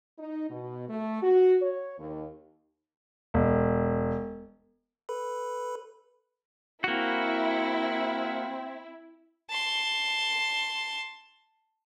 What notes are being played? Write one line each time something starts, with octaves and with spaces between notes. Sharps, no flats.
D#4
B2
A3
F#4
C#5
D#2
E1
A4 B4 B5
A#3 C4 E4 F#4
A5 C6